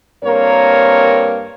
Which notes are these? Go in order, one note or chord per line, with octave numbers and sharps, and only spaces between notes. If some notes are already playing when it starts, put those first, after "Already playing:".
G2 A#3 C4 A#4 C#5